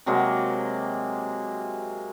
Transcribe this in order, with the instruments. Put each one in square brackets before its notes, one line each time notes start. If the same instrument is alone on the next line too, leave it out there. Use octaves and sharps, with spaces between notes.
[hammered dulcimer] C3 F#3 G#3 A#3